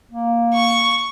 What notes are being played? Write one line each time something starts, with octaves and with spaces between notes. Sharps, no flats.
A#3
C#6